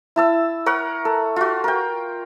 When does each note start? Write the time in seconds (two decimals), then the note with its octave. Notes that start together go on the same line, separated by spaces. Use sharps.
0.16 E4 A5 E6
0.66 A#4 C#5 F#5
1.05 A4
1.36 F4 F#4
1.64 A#4 G5